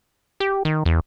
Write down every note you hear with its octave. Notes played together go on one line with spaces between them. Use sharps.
G4
D#3
E2